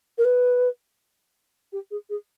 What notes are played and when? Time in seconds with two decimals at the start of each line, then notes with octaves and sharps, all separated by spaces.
0.18 A#4
0.24 B4
1.72 G4
1.91 G#4
2.09 G#4